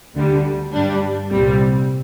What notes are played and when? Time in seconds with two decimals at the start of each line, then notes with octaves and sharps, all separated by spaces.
0.14 D2 D3 G3
0.72 G2 G3 D4
1.31 C2 A#2 G3 C4